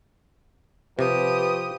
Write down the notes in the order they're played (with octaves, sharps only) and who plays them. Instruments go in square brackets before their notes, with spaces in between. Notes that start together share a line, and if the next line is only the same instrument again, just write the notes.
[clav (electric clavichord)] C3 [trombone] F3 [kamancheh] G4 D#6 [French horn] B4